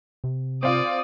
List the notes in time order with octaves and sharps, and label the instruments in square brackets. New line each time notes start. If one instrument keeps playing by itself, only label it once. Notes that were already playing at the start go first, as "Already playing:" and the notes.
[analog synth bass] C3
[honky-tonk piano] C4 F4 [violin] D5 [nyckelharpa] D#6